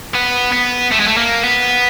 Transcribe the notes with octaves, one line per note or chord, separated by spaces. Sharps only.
B3
B3
A3
G#3
A3
A#3
B3